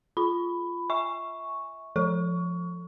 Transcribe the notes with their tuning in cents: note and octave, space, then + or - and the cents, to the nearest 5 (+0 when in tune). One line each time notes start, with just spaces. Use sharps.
F4 -10 B5 +10
E5 -25 G#5 +0 C#6 +0
F3 +0 A4 +15 C#6 +20